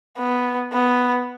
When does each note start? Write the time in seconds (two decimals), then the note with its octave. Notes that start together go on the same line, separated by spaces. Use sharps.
0.18 B3
0.73 B3